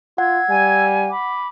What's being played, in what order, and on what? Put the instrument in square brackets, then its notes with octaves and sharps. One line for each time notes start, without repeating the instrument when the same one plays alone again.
[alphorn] F4 [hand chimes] F#5 [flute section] E6 G#6
[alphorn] G3 [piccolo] G#5
[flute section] B5 D6